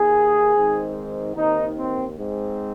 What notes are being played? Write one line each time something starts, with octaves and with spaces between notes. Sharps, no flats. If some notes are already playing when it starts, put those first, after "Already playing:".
Already playing: D#2 D#3 A#3 G#4
G#2 D#3 C4
D#2 D#3 C4 D#4
C4
G#2 G#3 C4